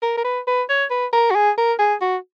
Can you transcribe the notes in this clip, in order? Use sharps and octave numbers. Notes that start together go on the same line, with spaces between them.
A#4
A#4
B4
B4
C#5
B4
A#4
F#4
G#4
A#4
G#4
F#4